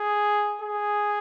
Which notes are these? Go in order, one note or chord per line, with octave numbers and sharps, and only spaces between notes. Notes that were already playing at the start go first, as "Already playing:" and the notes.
Already playing: G#4
G#4